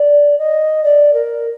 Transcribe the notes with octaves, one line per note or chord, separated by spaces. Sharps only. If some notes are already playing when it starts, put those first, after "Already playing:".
Already playing: D5
D#5
D5
A#4